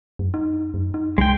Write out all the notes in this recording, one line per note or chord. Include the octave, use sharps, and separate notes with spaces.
F#2
D#4
F#2
D#4
C2 G#3 G5